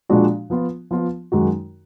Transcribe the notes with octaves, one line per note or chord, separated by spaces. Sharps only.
A#2 F3 G#3 D4 F#4
F3 B3 F4
F3 B3 F4
F#2 D#3 G#3 D#4 F#4